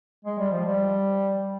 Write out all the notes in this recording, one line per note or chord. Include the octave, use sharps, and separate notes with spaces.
G#3
G3
F3
G3